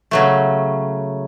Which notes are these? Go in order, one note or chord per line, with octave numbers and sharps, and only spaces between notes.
C#3 F#3 A3